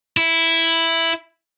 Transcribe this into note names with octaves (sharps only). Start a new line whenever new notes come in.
E4